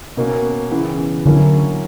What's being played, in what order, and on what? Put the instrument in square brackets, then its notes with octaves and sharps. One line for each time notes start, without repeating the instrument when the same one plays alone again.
[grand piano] B2 A#3 C#4
C#3 E3 B3
[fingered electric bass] D3 [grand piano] F#3 A#3 C#4 E4